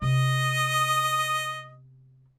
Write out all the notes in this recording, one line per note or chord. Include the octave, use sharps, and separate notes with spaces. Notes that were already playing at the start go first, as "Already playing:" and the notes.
C3 B3 D#5 D#6